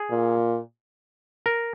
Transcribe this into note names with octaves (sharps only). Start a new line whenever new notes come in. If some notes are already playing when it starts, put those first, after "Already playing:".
Already playing: G#4
A#2
A#4